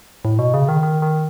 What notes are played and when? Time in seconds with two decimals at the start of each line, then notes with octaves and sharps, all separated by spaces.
0.25 A2
0.39 B2
0.54 C#3
0.69 D#3
0.83 D#3
1.02 D#3